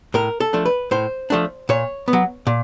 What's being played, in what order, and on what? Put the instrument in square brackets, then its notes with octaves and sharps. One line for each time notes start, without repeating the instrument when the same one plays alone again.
[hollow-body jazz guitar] A2 A#4
A4
F3 A3 D4
B4
A2 C5
F3 A3 D4
A#2 C#5
B3
F#3
A#2